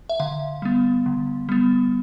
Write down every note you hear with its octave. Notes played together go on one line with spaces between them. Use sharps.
E5
D3 F5
G3 B3
D3
G3 B3